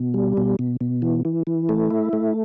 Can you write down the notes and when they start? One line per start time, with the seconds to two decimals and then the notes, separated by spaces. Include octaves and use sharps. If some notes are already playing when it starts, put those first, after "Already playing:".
Already playing: B2
0.14 G3
0.37 B2
0.59 B2
0.81 B2
1.02 E3
1.25 E3
1.47 E3
1.69 A3
1.90 E4
2.13 A3